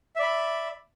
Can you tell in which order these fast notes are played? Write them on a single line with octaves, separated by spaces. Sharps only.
E5 D5 B5